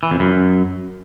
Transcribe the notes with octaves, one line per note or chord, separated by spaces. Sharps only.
E3
F2
F#2